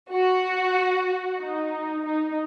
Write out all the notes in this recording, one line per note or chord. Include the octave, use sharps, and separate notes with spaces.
F#4
D#4
D#4